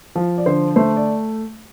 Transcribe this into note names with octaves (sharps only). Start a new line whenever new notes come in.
F3
D5
D3 C5
A3 C5
D5